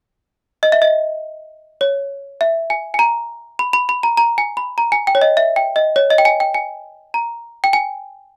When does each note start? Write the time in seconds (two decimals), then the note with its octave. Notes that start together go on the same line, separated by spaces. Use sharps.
0.63 D#5
0.72 E5
0.82 D#5
1.81 C#5
2.41 E5
2.70 G#5
2.94 G#5
2.99 A#5
3.59 B5
3.73 B5
3.89 B5
4.03 A#5
4.17 A#5
4.38 G#5
4.57 B5
4.78 A#5
4.92 G#5
5.07 G5
5.15 C#5
5.22 D#5
5.37 E5
5.56 G5
5.76 D#5
5.96 C#5
6.10 D#5
6.18 G5
6.25 G#5
6.40 G5
6.54 G#5
7.14 A#5
7.64 G5
7.73 G#5